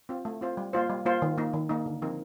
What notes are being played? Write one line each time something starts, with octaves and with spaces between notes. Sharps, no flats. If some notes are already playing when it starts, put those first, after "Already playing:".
C4 F4 C5
A3
C4 F4 C5
G3
A#3 F4 C5
G3
A#3 F4 C5
D#3
A#3 D#4
D#3
A#3 D#4
D3
F3 C4 D#4 A#4